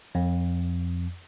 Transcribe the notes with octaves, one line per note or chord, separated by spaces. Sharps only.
F2